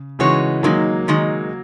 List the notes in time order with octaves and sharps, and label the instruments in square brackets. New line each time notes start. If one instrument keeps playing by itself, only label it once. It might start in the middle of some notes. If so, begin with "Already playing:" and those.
Already playing: [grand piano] C#3
[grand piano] C#3 E3 [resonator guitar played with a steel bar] G#3 D#4 F#4 C#5
[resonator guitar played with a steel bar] D#3 G#3 D#4 [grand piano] F#3 A#3
[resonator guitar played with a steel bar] D#3 G#3 D#4